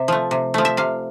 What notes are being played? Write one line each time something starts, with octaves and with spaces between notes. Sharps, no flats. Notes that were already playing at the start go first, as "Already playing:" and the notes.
Already playing: C3 E5
F3 A3
C3
F3 A3
E5
C3 F5